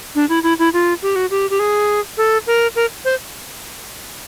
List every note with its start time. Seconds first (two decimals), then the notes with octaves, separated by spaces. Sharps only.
0.15 D4
0.29 E4
0.43 E4
0.59 E4
0.73 F4
1.02 G4
1.16 F#4
1.31 G4
1.50 G4
1.60 G#4
2.18 A4
2.47 A#4
2.76 A#4
3.05 C5